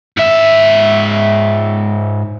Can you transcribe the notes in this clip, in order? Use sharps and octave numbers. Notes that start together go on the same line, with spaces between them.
G#2 E5